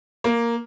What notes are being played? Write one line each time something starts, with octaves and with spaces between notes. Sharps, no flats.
A#3